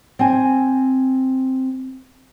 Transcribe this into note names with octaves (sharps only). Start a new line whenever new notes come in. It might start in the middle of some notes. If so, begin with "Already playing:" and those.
C4 G#5